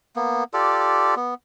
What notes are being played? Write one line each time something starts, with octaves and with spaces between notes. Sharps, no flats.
A#3 B3
F4 G4 A4 D5
B3